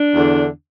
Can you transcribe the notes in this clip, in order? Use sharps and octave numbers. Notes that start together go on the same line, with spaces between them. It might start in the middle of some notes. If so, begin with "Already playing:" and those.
Already playing: D4
E2 D3